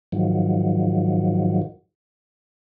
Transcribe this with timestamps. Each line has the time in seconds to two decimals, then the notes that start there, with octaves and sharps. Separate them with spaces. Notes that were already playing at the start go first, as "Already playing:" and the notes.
0.12 G#2 D#3 F3 F#3